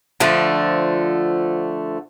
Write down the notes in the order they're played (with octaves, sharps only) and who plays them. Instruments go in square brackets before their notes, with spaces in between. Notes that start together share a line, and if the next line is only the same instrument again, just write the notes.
[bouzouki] D3 F3 A3